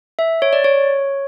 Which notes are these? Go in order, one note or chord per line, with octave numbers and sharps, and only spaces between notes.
E5
C#5
D5
C#5